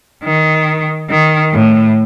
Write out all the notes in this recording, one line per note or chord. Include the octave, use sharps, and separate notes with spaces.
D#3
D#3
A2